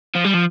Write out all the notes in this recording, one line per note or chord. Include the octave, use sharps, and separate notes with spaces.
F3
G3
F3